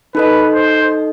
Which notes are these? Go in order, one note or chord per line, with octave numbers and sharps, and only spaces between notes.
D#4 A4 B4 D#5
C5